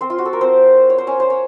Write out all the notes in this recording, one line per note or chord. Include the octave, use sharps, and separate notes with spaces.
C4 C5
F4
F#4
A4
A#4
C4 C5
C#5
C5
C#4 C#5
C5
C#5